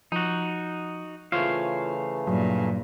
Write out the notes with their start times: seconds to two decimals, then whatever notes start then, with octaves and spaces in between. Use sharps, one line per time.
0.12 F3 D#4 F#4
1.32 C#3 E3 A3 F4 C5 C#5 F5
2.27 G2 A#2 F#3